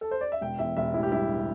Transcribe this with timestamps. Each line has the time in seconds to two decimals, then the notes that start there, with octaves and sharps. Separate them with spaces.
0.01 A4
0.11 C5
0.21 D5
0.32 E5
0.41 E1 G5
0.59 E2 E5
0.77 E1 E5
0.94 A1 E4
1.03 G4
1.12 G2 E4